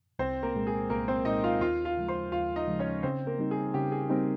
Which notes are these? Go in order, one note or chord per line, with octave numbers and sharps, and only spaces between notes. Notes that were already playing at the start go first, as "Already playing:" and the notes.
C2 C4 C5
A#3 A#4
A#2 G#3
G#4
C2 A#3 A#4
C4 C5
A#2 G#3 D#4 D#5
F4 F5
D#2 F4 F5
F4 F5
C#3 F3 G#3
C5 C6
D#2 F4 F5
D#4 D#5
C#3 F3 G#3
C#4 C#5
C#3 C4 C5
A#3 A#4
G3 C4 D#4
G#4
C#3 G4
G#4
G3 A#3 C4 D#4 A#4